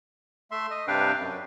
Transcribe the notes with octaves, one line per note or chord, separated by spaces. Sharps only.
A3 E5 C6
D#5
G2 C3 D4 B4 F5 G5
F#2